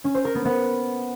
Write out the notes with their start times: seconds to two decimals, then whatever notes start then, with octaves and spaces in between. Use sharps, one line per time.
0.04 C#4
0.14 C5
0.25 A#4
0.35 B3
0.45 B3